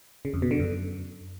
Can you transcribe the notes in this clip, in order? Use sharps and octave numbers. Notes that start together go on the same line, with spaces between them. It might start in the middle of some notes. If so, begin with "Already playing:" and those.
C#3
F2
B2
D3
F#2